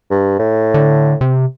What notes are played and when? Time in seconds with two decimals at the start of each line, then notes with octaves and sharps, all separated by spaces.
0.10 G2
0.39 A2
0.74 D3
1.21 C3